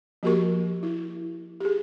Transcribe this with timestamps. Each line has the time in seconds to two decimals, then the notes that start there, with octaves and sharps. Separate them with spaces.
0.23 F3 A#3 F#4 G4 A#4 C#6
0.83 E4
1.61 G4 G#4